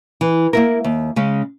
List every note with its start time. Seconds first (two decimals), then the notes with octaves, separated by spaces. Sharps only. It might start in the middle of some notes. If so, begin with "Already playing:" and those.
0.21 E3
0.53 A#3 E4 A#4
0.84 D#2
1.16 C#3 G#3 C#4